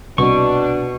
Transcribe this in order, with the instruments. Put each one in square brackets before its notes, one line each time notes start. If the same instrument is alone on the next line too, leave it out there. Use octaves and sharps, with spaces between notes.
[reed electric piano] C2 [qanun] B2 [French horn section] D4 [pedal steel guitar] C#6